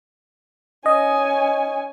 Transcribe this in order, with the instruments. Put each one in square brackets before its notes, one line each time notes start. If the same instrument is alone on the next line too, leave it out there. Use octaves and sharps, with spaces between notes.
[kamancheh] C#4 G#5 [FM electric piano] D#5